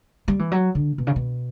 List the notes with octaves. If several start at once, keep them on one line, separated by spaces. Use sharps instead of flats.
G3
E3
F#3
D3
B2
C#3
B2